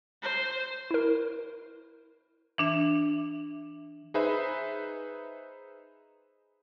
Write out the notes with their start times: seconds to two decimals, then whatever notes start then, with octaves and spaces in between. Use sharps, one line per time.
0.23 C5
0.91 E4 A#4
2.58 E3 D4 E5
4.14 D#4 G#4 B4 C5 E5 B5